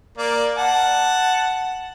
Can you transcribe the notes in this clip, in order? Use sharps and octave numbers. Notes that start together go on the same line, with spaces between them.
A#3 D5
F#5 A5